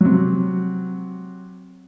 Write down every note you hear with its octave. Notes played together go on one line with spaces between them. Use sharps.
C3 F#3